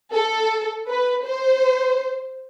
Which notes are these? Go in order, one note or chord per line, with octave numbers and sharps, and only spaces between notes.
A4
B4
C5